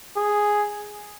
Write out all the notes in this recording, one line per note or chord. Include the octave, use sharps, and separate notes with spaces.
G#4